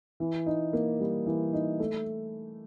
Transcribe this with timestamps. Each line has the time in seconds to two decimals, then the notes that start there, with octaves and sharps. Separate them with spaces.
0.20 E3
0.46 D#4
0.73 A#3
1.00 G3
1.26 E3
1.53 D#4
1.80 A3